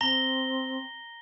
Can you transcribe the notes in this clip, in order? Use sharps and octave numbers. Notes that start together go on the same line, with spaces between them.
C4 A#5 A#6 G7